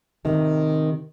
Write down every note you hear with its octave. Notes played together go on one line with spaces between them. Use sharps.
C3 D#3